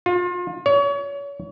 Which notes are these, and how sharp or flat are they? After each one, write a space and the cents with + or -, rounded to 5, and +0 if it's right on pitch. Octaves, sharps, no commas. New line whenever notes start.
F4 +35
C#5 +35